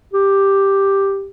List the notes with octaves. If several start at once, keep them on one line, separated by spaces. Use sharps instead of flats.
G4